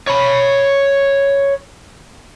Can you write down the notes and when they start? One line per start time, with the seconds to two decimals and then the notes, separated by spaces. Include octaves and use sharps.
0.07 C#5 B5